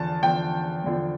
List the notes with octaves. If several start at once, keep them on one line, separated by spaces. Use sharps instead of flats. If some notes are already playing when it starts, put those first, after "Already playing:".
Already playing: E2 D3 F3 A5
E2 D3 F3 G5
E2 D3 F3